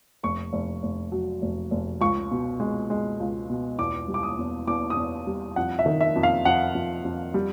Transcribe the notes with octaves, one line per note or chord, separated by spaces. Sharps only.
F1 C#6
F1
F1
F#3
F1
F1
C#2 C#6
B2
G#3
G#3
C#2
B2
E2 D6
G3
D6
D#6
E2
E2 D6
D#6
E2
G3
F2 F#5
E5
D#3
E5
F2
F5
F2 F#5
F2
F2
G3